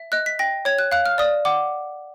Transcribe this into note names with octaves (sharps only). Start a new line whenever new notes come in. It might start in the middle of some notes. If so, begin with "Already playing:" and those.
Already playing: E5
D#5 F#6
B6
G5 A#6
C#5 G#6
F#6
F5 F#6
F6
D5 D#6
F#5 D6